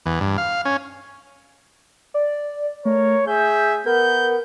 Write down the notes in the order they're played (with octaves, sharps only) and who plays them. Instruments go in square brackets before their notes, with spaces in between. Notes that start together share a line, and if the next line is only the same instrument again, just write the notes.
[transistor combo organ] E2
G2
F5
C#4
[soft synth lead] D5
[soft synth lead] A3 [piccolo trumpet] A#4 [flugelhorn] C#5
[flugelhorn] G#4 [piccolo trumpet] E5 [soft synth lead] G6
[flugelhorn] B3 [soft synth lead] A#4 [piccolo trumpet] G6